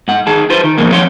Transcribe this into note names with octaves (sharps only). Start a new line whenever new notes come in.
G#2 F#5
D#3 G#4 A5
F4 B4 C5
D#3
A#2 E3 F3 G#3 A#3
F3 C4 C#5 F5 F#5 C6